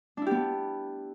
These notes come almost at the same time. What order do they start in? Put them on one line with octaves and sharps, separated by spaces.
D4 E4 G4 B3